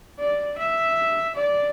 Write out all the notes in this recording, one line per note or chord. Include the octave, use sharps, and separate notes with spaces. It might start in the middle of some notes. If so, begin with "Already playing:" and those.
D5
E5
D5